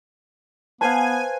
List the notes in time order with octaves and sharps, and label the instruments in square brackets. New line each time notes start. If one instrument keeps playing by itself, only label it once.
[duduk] B3 [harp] B4 C5 F5 [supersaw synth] G#5 [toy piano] A5